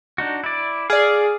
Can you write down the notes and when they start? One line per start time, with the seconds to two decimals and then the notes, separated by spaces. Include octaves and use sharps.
0.18 D4 D#4 F#4
0.44 E4 D5
0.90 G#4 D5 F5